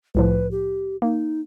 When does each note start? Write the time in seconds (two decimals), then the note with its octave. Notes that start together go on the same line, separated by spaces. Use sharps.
0.15 C2 A2 F3 B4
0.51 G4
1.02 A#3 D#4